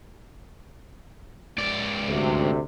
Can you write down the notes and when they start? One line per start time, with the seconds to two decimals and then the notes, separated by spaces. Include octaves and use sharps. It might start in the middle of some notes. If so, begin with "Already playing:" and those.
1.58 C#2 D5
2.08 D2 C3